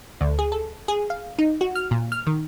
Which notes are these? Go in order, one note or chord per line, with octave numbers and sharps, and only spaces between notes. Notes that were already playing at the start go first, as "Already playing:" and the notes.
D2
G#4
A4
G#4
F5
D#4
F#4
F6
A#2
F6
D#3